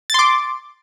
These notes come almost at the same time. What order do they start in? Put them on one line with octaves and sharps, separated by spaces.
A6 C6 D6